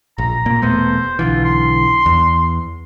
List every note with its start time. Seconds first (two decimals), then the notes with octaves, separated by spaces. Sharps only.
0.18 A#1 A#5
0.46 A#2 A#3
0.62 E1 A3 B3 C5
1.19 B1 D3 E3 F4
1.44 C6
2.06 E2